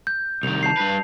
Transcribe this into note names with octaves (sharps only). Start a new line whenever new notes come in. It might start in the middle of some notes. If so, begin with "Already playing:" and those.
G6
C2 D#3 F7
A5 G6 C7
G2 B4